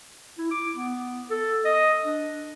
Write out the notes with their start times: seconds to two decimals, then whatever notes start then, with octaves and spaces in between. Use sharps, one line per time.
0.38 E4
0.51 D6
0.76 B3
1.31 A4
1.65 D#5
2.04 D4